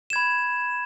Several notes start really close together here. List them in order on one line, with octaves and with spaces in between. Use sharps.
E7 G#6 B5